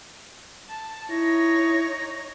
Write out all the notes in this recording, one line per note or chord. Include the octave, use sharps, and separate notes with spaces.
A5
D#4 E4 C#5 A#6